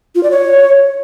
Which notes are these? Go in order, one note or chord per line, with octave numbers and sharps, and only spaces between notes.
F4
D5
C#5